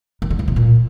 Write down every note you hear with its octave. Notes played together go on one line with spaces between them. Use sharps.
D#3
D3
E3
C3
A#2